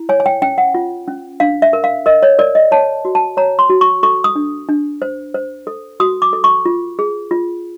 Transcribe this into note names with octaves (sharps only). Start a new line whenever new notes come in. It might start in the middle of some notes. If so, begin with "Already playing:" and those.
Already playing: E4
C#5 G#5
G#5
G5
C#4 G5
F#5
F4
C#4
D4 F5
E5
A#4
F5
A#4 D#5
C#5
A#4 D5
D#5
C#5 A5
F#4
A5
C#5 A#5
C6
F#4
C#6
A4 C#6
D#6
D4
D4
C5
C5
A4
F#4 D#6
D6
A4
C#6
F4
G#4
F4